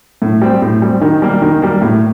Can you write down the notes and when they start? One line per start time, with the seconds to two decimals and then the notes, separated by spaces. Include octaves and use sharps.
0.22 A2
0.42 G3 C4
0.62 A2
0.82 G3 C4
1.01 D#3
1.22 G3 A#3
1.42 D#3
1.62 G3 A#3
1.82 A2